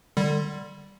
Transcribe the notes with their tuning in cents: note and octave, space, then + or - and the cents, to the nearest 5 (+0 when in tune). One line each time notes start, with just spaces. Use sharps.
D3 +30 G3 +0